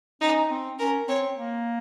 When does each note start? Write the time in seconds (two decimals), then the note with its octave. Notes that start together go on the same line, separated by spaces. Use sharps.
0.21 C#4 D#4
0.50 C4
0.79 C#4 A#4
1.08 C4 C#5
1.37 A#3